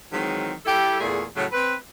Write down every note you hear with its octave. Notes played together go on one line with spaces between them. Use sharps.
D#3 E3 F#3 G#3 C4
G3 E4 G4 A4
E2 A#2 A3 G#4
A2 C#3 F#3
C4 B4